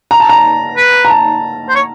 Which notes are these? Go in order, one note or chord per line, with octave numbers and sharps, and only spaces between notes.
A#5
A5
A#5
B4
A#5
A5
C5
C#5